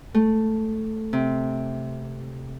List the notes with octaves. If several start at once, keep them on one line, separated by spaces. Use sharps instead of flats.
A3
C3